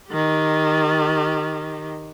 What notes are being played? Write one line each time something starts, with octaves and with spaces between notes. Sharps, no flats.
D#3 G4